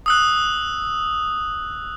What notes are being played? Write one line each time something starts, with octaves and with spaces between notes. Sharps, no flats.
D#6 E6 F#6